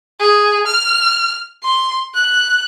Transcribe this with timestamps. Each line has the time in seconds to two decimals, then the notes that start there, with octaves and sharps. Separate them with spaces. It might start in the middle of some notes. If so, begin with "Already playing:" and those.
0.20 G#4
0.67 F6
1.63 C6
2.14 F#6